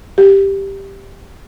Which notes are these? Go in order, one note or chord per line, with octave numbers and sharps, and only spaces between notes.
G4